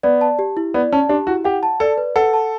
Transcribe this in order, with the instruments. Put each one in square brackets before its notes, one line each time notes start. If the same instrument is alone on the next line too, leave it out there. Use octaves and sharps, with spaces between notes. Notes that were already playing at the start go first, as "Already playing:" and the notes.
[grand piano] B3 [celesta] D5
[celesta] A5
G4
E4
[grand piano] B3 [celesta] D5
[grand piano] C#4 [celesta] A5
[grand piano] D4 [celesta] G4
[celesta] E4 [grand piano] F#4
[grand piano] G4 [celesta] F#5
[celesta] A5
[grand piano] A4 [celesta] D5
[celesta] B4
[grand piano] A4 [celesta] F#5
[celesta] A5